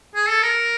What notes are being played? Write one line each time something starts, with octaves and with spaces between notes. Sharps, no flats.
G#4
A4
A#4